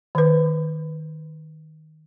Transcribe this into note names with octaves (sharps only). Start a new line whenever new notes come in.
D#3 B4